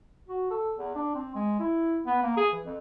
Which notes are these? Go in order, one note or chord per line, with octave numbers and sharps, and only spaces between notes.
F#4
A4
E2
D4
C4
G#3
E4
B3
A#3
G#4
E3
F2